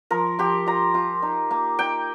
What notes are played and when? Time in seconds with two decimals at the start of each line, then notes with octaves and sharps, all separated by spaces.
0.11 F3 A#4
0.39 F3 G4
0.67 F4 A#5
0.94 F4
1.22 D#4
1.51 A#3
1.79 D#4 G5